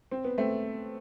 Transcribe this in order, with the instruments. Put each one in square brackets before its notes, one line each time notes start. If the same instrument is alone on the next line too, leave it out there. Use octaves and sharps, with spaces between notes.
[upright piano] C4
B3
A3 C4